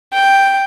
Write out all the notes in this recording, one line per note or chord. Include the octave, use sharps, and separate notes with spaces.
G5